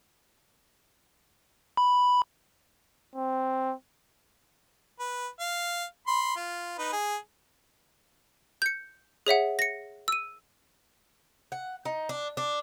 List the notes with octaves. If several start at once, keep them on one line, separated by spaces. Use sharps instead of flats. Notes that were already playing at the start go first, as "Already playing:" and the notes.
B5
C4
B4
F5
B5 C6
F4
D#4 B4
G#4
G6 C#7
G#4 C#5 E5 F#5
A#6 C#7
E6 D#7
F#5
D#4
D4
D4